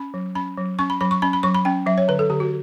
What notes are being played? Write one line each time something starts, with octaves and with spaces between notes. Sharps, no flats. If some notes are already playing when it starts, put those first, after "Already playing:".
Already playing: C#4 B5
F#3
C#4 B5
F#3
C#4 C#6
B5
F#3 B5
C#6
C#4 B5
B5
F#3 C#6
B5
C#4 G5
F#3 E5
C#5
D3 B4
A4
D3 G4
F#4